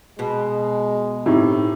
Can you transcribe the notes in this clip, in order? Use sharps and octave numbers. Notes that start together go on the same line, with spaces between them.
B2 G#3
A2 C4 D#4 G4